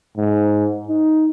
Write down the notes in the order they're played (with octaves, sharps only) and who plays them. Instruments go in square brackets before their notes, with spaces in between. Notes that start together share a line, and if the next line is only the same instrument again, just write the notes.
[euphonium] G#2
D#4